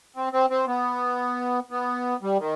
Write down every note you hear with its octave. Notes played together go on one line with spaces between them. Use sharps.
C4
C4
C4
B3
B3
G3
D#3